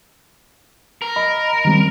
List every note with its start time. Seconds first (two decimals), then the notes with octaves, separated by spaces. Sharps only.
1.02 A#4
1.16 D#5 B5
1.65 D#3 G3 C4